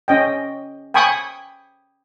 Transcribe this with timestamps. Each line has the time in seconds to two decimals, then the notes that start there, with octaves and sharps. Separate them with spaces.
0.08 C#4 D#5 G5
0.94 G5 G#5 B5 C#6 D#6